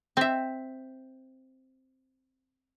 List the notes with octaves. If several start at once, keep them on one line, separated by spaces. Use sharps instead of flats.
C4 E5